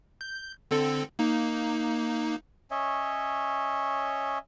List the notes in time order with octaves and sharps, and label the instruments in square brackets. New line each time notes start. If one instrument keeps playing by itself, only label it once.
[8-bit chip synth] G6
D3 C4 A4
A#3 D#4
[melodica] C#4 C#5 D#5 E5